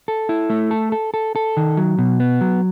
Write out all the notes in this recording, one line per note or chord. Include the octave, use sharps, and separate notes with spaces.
A4
E4
A3
A4
A4
A4
A4
D#3
F#3
B2
B3
F#3